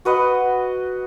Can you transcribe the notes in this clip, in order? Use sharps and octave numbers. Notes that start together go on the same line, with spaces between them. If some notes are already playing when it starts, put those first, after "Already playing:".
F#4 B4 D#5 F#5